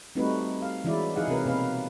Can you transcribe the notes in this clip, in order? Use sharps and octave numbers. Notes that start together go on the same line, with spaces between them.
G3 A3 C4 D#4 F#4 B4
F5
E3 F#3 G#3 E4 D5
F#3 D#4 E4 G#4 F5 F#5
C3 C4 A#4 B4
B2 A#3 B4 F5